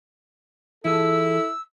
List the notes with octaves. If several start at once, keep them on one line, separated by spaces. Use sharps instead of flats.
E3 E4 F4 G#4 A4 E6